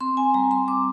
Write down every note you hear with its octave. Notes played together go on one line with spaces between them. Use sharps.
C4 C6
C4 G#5
G3 A#5
C4 C6
C4 D6